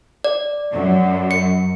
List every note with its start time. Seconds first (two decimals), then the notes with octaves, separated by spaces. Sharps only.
0.24 D5
0.73 F#2
1.31 C#7